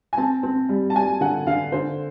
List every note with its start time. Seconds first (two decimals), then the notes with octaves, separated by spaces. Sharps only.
0.13 G#5
0.17 C4 A5
0.43 C4
0.69 G3
0.90 A5
0.95 G3 G#5
1.21 D3 F#5
1.47 D3 F5
1.72 D3 C5